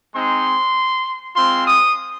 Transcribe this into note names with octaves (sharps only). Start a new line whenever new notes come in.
G#3 C4 D#4 C6
G#3 C4 F4 C6
D#6